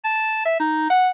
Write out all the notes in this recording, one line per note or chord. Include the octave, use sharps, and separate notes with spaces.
A5
E5
D#4
F#5